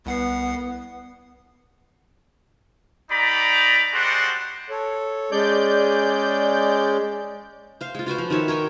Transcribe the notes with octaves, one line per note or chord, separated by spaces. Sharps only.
C2 B3 F#5 C7
G3 D#4 D5 A#5 B5
G3 G#3 F#4 C5 D5 F#5
A4 C#5
G#3 C#4 G#4 D5 G6
C5 F5
G#3 F4
F4 F#4 B4 C5
F3
D#3 F#4 C#5 E5
A#4 C#5 G5 G#5